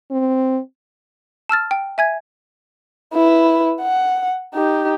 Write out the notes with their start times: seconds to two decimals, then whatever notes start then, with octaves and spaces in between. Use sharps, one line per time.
0.11 C4
1.49 A5 E6 F6 A6
1.71 G5
1.98 E5 G#5 G#6
3.13 E4 B4
3.81 F#5
4.55 D#4 G4